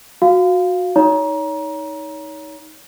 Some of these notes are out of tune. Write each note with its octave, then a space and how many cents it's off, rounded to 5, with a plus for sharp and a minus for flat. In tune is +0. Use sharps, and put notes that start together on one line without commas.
F#4 -20 F5 +0
D#4 +15 C#5 +30 A#5 +25